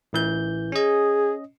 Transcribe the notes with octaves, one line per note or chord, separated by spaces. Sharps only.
A1 E3 G6
C#4 G#4 D#5